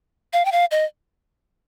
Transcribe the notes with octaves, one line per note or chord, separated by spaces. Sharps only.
F5
G5
F5
D#5